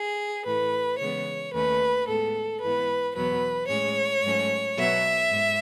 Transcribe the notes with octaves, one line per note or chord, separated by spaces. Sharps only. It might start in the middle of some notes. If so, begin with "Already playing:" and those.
Already playing: G#4
A2 E3 A3 B4
C#3 E3 G#3 B3 C#5
D#2 D#3 A3 C#4 B4
A2 G#3 B3 A4
G#2 E3 B3 B4
E2 B2 F#3 B3 B4
A2 G#3 C#4 C#5
G#2 F#3 A3 C#4
B2 F#3 B3 E5
G#2